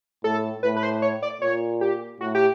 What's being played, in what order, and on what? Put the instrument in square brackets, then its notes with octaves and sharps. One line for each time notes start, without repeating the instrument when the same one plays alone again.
[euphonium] A2 [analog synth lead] A4
[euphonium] A2 [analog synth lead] B4
[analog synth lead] B4
C5
C#5
D5
[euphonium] A#2 [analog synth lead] C#5
[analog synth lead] G4
[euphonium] A2 [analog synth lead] F#4
[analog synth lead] G4